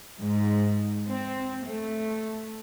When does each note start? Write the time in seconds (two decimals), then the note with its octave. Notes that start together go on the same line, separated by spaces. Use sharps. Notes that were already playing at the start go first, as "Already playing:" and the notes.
0.21 G#2
1.08 C4
1.65 A3